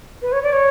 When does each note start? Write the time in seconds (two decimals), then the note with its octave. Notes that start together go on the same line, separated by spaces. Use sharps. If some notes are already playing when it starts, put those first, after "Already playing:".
0.22 B4
0.32 C#5
0.43 D5
0.53 C#5